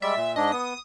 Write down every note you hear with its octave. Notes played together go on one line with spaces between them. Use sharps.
G3 G#3 D5 E5
A#2
G#2 D4 D#5
B3 D#6